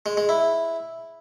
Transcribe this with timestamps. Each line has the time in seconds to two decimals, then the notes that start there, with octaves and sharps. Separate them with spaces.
0.06 G#3
0.17 G#3
0.29 E4